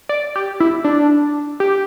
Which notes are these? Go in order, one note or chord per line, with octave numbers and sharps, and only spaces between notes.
D5
G4
E4
D4
G4